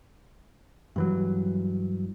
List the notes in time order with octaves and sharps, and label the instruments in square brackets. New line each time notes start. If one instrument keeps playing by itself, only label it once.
[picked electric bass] G2 E3 F#3